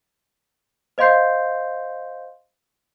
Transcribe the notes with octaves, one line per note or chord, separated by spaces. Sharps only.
C5 D#5 F5 C6 G6 C7